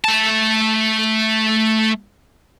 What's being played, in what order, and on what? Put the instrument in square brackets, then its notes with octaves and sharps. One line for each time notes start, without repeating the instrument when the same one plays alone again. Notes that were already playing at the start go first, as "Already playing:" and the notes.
[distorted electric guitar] A3 A5